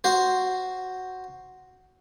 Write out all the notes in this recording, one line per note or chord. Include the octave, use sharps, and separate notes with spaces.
F#4 C5